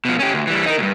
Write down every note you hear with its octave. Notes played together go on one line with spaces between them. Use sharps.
B2 F3
C#4 G4
D2
E3 G3
D#4 A#4
D2 G2